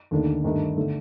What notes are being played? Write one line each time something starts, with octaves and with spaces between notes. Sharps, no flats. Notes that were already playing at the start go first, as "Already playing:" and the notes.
D#2 D3 A3 D4
G2 D#3 A3 D4
D3 A3